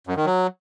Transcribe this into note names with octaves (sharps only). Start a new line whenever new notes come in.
F#2
D#3
F#3